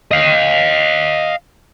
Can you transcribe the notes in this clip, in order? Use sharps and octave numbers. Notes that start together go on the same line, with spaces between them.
D#5 F5